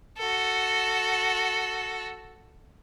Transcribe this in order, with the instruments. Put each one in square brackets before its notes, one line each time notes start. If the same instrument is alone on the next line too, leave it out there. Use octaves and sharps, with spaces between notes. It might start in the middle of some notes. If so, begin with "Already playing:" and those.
[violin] F#4 A4